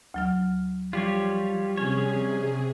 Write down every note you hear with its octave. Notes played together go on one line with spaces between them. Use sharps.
D2 F#3 F6
F3 G3 F4 G4 C#5
C3 C#4 G#4 C#5